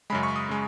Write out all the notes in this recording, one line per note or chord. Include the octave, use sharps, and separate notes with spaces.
F#2 C#3 G#3 B5
C#6
D#6
C#3 G#3